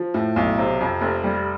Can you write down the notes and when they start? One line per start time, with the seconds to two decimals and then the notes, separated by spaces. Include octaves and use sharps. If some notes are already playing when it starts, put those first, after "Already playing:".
Already playing: F3
0.14 A2
0.36 B1
0.58 C3
0.80 F2
1.01 F1
1.24 G3